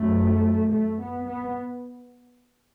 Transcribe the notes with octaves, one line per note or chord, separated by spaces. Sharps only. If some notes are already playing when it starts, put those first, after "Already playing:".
Already playing: F#2 A3
A3
B3
B3